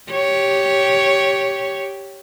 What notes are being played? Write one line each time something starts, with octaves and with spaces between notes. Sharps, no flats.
G4 C#5